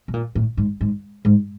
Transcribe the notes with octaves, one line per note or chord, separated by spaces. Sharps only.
B2
A#2
A2
G#2
G#2
G#2